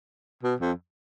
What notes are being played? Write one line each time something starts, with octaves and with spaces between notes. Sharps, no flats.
B2
F2